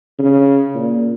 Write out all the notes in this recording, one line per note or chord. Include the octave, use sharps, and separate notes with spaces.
C#3
A#2